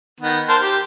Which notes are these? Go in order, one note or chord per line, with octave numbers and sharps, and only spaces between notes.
D#3 B3
A#4 C5 A5
G4